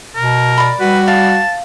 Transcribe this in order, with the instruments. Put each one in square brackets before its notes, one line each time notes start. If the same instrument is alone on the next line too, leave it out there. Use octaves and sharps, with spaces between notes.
[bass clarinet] B2 [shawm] A#4
[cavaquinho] D5 B5
[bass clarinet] G3 [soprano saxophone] F#4 [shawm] B4
[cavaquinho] F5 [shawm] A5